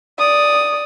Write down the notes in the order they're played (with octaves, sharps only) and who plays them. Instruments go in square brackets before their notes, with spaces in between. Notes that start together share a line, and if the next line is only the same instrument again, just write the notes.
[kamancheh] D5 D#6